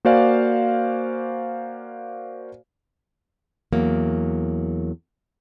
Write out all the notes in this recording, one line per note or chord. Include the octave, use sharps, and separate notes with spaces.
A#3 F#4 C5 D5 F5 G#5
E2 F#3 A#3